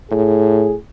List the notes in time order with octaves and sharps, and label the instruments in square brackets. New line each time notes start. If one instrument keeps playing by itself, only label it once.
[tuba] A2 [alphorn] G#4